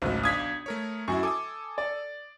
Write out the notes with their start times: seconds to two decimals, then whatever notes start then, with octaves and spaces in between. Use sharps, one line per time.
0.02 G#1 C#2 F#3 A3
0.23 B1 D4 F5 D#6 G#6 B6
0.66 A3 A#4 C#5
1.08 F#2 E4 F#4 C#6
1.23 A4 G#5 D6 D#6
1.78 D5